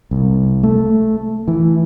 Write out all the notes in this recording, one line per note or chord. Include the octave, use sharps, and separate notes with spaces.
C2
A3
E3